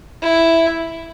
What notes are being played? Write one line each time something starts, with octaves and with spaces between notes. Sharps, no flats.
E4